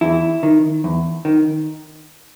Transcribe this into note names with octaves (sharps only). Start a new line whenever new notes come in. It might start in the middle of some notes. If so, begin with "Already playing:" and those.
E2 E4
D#3
E2
D#3